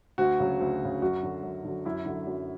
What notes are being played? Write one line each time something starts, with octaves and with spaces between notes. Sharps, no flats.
D2 F#4
C#3 F#3
D2
C#3 F#3
F#2 F#4
D3 F#3
F#2
D3 F#3
F#2 E4
D3 F#3
F#2